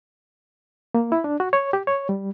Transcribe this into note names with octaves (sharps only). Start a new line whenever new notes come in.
A#3
E4
D4
F#4
C#5
G4
C#5
G3